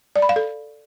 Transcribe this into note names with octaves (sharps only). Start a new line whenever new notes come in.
D5
B5
F5
A4